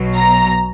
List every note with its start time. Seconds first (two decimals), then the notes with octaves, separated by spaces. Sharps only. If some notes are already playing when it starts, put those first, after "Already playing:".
Already playing: B1 B2 F#3
0.15 A#5